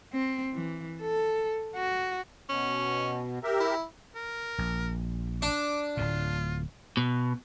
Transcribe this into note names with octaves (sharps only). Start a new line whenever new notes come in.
C4
E3
A4
F#4
B2 C#4
G4 A#4 E5
E4
A#4
A#1
D4 D6
D1 A2 F4
B2